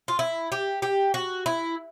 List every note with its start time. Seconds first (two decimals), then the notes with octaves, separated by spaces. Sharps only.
0.08 F4
0.19 E4
0.52 G4
0.82 G4
1.14 F#4
1.46 E4